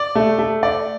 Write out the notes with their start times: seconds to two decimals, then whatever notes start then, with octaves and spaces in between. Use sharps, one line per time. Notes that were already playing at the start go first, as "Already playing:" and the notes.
Already playing: D5
0.15 A3
0.39 A3
0.63 D5